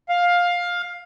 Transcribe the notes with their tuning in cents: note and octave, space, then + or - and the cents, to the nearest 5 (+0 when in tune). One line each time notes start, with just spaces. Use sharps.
F5 +15